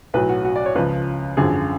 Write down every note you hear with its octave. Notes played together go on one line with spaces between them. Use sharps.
B1 A2 F#3 B4
F#4
F#4
D5
C#5
C#2 C#3 F3 B4
G#1 F#2 D3 F3 G#4